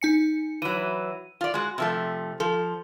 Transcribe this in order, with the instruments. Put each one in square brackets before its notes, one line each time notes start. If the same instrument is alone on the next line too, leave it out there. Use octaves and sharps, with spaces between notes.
[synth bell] D#4 G#5 C#7
[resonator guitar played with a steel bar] E3 F#3 [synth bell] D#7
[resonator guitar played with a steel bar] F4 D5
G#3 F#4
C3 F3 A3
[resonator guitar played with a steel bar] F3 [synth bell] A4